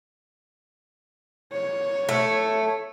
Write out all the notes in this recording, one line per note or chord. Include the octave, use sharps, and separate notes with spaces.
C#5
A3